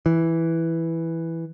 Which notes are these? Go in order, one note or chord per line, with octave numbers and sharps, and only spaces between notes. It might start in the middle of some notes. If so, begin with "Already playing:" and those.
E3